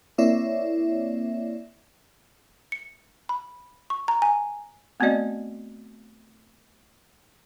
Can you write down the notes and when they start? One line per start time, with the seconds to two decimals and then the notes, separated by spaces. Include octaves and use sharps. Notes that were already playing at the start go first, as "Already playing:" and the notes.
0.18 A#3 C4 E4 C#5 D5 E5
2.72 C#7
3.29 B5
3.90 C#6
4.08 A#5
4.22 G#5
5.00 A3 B3 C4 F#4 D5 D#5